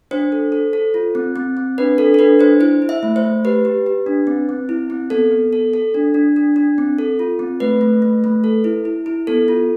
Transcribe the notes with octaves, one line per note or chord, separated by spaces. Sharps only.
D4 C5
A4
A4
A4
F4
C4
C4
C4
D4 B4
D4 A4
A4
D4 B4
D4 C5
E4 C5
E4
E5
A3
C5
A3
G4 B4
G4
G4
D4
C4
C4
E4
C4
B3 A4
B3
A4
A4
D4
D4
D4
D4
C4
A4
F4
C4
A3 B4
A3
A3
A3
A4
E4
E4
E4
B3 A4
F4